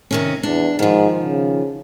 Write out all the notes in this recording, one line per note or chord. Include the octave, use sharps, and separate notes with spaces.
C3 D#3 C#4
E2 D4
G#2 D#3 F3
C#3